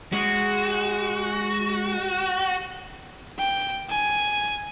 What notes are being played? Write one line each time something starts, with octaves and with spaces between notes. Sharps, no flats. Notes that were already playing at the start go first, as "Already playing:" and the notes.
G#3 F#4
G5
G#5